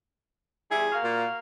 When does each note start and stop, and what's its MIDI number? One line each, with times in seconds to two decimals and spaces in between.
0.71 0.87 40
0.71 0.87 55
0.71 0.87 64
0.71 0.98 68
0.92 1.38 58
0.92 1.38 66
0.92 1.38 77
1.03 1.25 46